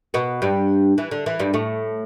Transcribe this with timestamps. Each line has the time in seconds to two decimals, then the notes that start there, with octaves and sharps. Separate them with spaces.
0.14 B2 B3
0.42 G2 G3
0.98 E3
1.11 D3
1.26 E3
1.39 G2 G3
1.54 A2 A3